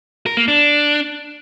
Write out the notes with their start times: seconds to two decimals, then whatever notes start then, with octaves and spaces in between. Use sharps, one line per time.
0.26 A#4
0.37 A#3
0.48 D4